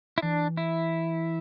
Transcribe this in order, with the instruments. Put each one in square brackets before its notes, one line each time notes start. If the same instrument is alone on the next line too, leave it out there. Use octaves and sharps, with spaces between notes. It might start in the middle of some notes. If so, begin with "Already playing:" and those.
[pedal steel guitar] E4
[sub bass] E3 [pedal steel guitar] D4
[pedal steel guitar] E4